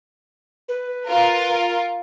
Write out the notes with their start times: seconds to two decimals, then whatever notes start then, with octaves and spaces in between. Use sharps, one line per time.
0.69 B4
1.06 F4 A#4